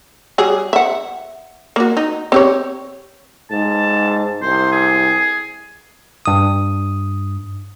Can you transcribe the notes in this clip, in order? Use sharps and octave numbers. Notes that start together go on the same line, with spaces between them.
F#3 G3 G#4
E5 F#5
A#3 F#4
D#4
C4 G4 C#5
G#2 A5
C2 C5
G#4
G2 D#6